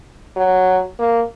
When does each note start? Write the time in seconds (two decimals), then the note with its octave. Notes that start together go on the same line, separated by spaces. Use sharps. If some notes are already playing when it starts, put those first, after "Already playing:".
0.37 F#3
0.99 A#3